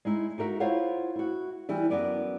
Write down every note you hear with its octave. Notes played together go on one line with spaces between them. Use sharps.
G#3 D#4 E4
D#4 F#4 A#4 E5
E4 F4 C5 C#5 F5 F#5
E4 F#4
E3 G3 E4
F#2 B3 A#4 D5